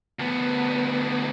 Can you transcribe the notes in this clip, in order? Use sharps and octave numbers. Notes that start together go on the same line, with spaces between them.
D2 B3